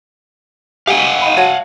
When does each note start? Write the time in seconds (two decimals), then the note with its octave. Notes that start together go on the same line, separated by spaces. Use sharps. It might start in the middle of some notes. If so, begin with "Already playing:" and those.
0.87 G4 F5 F#5 G#5
1.22 D#4 B5
1.36 F#4 C#5 A5